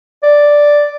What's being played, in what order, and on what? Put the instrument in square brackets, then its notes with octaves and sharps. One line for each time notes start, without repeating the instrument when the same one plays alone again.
[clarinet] D5